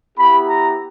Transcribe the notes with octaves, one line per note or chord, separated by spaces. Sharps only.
B3 E4 G4 B5
A#5